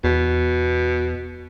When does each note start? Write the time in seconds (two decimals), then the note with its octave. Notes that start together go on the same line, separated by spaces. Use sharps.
0.04 E2 B2